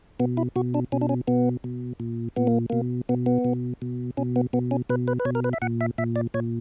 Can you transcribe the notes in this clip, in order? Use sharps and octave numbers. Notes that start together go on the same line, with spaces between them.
B2 B3
E4
B2 F#4
D4
B2 C#4
D4
C#4
B2 B3
B2
A#2
A#2 B3
A#3
B2 A#3
B2 B3
B3
B2
B2
B2 C#4
B3
B2 B3
C#4
B2 B4
B4
B4
B2 C#5
A#4
B4
E5
A#2 F#5
E5
A#2 E5
D5
A#2 C#5